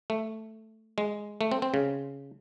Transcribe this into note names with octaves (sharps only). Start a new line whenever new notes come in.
A3
G#3
A3
C4
C4
C#3